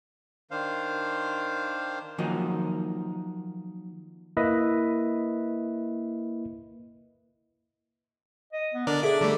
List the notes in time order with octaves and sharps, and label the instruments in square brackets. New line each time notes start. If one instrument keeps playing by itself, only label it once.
[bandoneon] D#3 D4 C5 F5
[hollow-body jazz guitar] D#3 F3 F#3 A#3 D#4
[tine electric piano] A#3 E4 B4 D#5 E5
[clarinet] D#5
B3
[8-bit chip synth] D3 A#4 D5 [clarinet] D4
[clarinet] G#4 [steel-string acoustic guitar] A4 E5 [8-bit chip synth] D5 D6
[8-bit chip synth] D3 G3 A3 [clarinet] D5